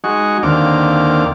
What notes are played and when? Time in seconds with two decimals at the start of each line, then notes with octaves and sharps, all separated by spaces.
0.04 G#3 D#4 F#4 C#6
0.43 D#2 D3 A#3 C4 F5 D6